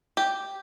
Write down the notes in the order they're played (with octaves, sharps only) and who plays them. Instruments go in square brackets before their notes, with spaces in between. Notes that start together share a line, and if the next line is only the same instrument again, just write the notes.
[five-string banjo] G4